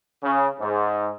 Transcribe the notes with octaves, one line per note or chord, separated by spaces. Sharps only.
C#3
G#2